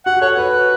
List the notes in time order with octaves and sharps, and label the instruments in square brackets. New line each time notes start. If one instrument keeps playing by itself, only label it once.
[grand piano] F#4 [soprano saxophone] F#5
[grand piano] F#4
[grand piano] A4 [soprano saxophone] C#5
[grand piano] F#4 [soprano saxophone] B4